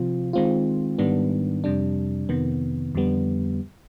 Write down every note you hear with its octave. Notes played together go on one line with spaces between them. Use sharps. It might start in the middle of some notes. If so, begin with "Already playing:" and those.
Already playing: C3 F3 C4 F4
D#3 G#3 C4 F4
G#2 D#3 G3 B3 D4
F2 C3 G3 D4
F2 C3 D#3 B3
F2 D3 G3 B3